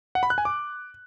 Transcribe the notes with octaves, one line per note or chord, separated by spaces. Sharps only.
F#5
B5
F#6
G#5
D6